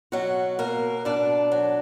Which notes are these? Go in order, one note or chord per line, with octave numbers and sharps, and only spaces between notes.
B2 F#3 F#4
B2 A#3 A#4
B2 D4 D5
F#3